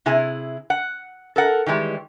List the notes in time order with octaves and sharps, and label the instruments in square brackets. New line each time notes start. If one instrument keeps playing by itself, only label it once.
[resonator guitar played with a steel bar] C3 E4 G#4 G#5
F#5
A4 A#4 F#5
D#3 E3 G3 G#3